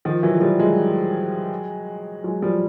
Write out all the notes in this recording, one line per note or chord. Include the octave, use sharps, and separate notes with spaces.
D#3 F3
E3 F#3
F#3
F3 G3
F#3 G#3
F#3 G#3
F3 G3